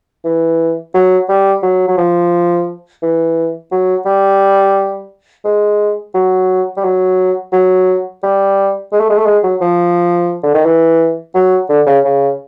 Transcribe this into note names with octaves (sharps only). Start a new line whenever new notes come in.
E3
F#3
G3
F#3
F#3
F3
E3
F#3
G3
G#3
F#3
G3
F#3
F#3
G3
G#3
A3
G#3
A3
G#3
F#3
F3
D3
D#3
E3
F#3
D3
C#3
C#3